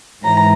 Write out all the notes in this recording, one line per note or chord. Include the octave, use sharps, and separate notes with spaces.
G#2 E3 A#5